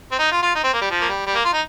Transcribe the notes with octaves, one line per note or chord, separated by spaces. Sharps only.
C4
D#4
F4
F4
D#4
C4
A#3
G3
F3
A#3
G3
G3
A#3
F4
D#4